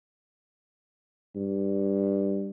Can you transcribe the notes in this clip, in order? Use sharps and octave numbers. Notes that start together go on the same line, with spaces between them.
G2